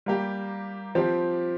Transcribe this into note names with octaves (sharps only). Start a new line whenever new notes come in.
G3 A#3 G4
F3 C4 G4